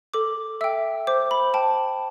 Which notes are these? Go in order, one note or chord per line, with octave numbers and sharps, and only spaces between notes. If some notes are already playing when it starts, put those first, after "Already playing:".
A4 D6
E5 G5 E6
C5 D6
B5
G5 A5